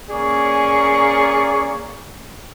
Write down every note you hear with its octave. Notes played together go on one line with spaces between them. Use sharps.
A#3 C#4 G#4 D5 C#6